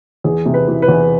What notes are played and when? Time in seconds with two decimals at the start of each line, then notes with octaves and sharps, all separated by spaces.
0.24 E2 G#4
0.46 C3
0.54 B4
0.68 E3
0.82 B4
0.88 E2